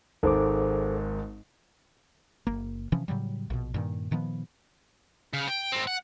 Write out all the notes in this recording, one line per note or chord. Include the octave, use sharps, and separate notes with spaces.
G#1 G#2 A4 C5 D6
F#1 A#3
C3 E3 F3 C#4
A2 C#3 F#3 G3
A#1 B2
G2 A#2 D#3
A#2 D#3 F3 B3
C#3
G5
G#2 C4
F#5